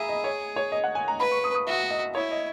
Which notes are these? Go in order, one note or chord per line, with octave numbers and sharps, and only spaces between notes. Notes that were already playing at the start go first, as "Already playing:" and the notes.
Already playing: G#4 E5 A#5 B5
D#5
C#5
C#5
D#5
F#5
G#5
A#5
B4 B5
C#6
D#6
D#6
F#4 E5
D#5
E4 C#5
D#5